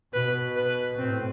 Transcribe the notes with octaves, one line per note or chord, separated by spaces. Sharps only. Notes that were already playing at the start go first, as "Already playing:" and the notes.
B2 B4
B4
A2 C4